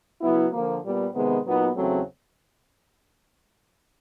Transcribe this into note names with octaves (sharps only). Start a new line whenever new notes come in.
C#3 F#3 B3 E4
D3 F3 A#3
A#2 G3 B3
C3 D#3 G#3 B3
A#2 F#3 B3 D#4
E2 C#3 F#3 A3 C4